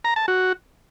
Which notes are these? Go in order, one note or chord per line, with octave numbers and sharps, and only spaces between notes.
A#5
A5
F#4